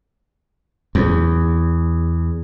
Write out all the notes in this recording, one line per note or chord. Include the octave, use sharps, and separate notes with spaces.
E2